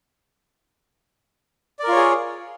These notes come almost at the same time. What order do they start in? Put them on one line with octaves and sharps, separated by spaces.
D5 A#4 F4 C#5 G#4